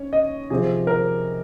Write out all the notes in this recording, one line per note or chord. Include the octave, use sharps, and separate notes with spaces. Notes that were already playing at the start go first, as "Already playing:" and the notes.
Already playing: C#4 C#5
D#5
C3 F3 C4 G#4
A#4